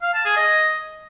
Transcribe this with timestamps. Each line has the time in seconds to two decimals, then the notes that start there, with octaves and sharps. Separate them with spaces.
0.02 F5
0.14 A5
0.25 G#4
0.37 D#5